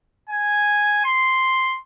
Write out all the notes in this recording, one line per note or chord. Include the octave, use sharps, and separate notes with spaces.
G#5
C6